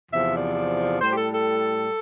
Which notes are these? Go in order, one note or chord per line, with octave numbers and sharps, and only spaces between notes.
E2 C3 F3 E5
D5
A2 G3 C5
G4
A4
A4